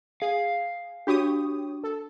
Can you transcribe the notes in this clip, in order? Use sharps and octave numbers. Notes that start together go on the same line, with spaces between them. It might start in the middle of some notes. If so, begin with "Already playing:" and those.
G#4 F5
D4 F#4 G4 C#5 D#6
A4